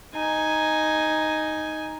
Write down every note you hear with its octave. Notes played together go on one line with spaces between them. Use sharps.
D#4 G#5